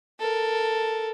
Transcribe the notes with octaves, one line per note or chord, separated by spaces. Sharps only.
A4 A#4